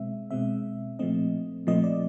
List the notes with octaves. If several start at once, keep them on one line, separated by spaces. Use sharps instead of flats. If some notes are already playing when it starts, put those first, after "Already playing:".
Already playing: B2 G#3 C4 E5
B2 G#3 C4 E5
A#2 F3 A3 C4 D#5
A#2 F3 A3 C4 D#5
D5